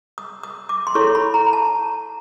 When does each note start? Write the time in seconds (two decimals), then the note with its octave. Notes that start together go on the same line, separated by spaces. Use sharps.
0.18 D#6
0.43 D#6
0.69 D6
0.87 C6
0.95 E4 A4 C#5 C#6
1.15 B5
1.34 A#5
1.53 A5